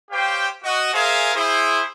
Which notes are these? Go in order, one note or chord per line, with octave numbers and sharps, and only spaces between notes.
G4 C5 C#5 F5 G5
F#4 D#5
G#4 A#4 C5 E5 F5 G#5
E4 G#4 C5